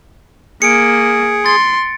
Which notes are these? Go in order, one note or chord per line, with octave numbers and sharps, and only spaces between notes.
A#3 G#4 C#7 D7
C6 A6